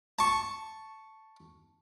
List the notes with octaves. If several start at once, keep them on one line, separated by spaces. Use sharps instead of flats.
A5 C#6